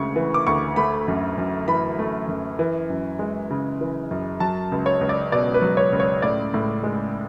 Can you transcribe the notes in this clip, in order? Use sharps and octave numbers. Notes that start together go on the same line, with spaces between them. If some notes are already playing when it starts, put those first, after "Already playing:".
Already playing: D2 C#3 G#3 C#6
E3
D6
D2 C#6
A3 B5
F#2
F#2
E3 B5
A3
F#2
E3
F#2
G#3
C#3
E3
F#2
F#3 A5
C#2
C#5
C#2
D5
B2 D5
B4
F#3
C#5
C#2
C#5
A2 D5
A2
G#3